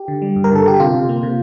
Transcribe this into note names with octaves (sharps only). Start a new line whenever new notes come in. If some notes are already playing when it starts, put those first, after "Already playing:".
Already playing: G4
D3
G3
G2
A#4
D3 A4
D3 G4
C3 F4
C3
A#3
C3